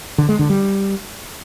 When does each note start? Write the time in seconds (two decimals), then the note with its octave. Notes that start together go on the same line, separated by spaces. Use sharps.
0.18 D3
0.29 G#3
0.39 D3
0.50 G3